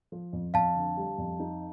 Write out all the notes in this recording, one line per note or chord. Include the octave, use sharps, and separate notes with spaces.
F3
F2
F2 F5 A5
D3
G3
F2
D#4